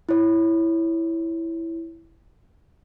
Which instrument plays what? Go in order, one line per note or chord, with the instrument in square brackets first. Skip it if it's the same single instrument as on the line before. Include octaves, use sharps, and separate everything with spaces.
[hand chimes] E4 C#5